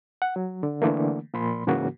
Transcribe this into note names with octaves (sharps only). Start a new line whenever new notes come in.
F#5
F#3
D3
D3 E3 A3 A#3
A#2 F3 B5 C6
G#2 C#3 E3 A#3 F#4